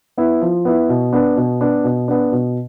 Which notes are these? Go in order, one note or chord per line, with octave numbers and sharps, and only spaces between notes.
B3 E4
F3
B3 E4
B2
B3 D4
B2
B3 D4
B2
B3 D4
B2